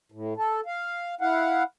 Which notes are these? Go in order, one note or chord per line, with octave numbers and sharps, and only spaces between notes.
A2
A4
F5
E4 F5 F#5